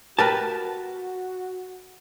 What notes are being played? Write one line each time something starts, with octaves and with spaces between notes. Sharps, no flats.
F#4 G4 A#4 B4 A5